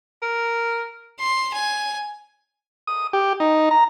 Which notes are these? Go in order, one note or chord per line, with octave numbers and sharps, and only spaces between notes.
A#4
C6
G#5
D#6
G4
D#4
A#5